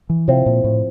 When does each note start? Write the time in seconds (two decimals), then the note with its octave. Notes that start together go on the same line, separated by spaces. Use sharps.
0.10 E3
0.28 C3 F3 C4 E4
0.46 A#2
0.64 A2